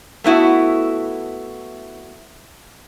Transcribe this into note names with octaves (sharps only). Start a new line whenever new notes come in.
A3 B3 E4 F#4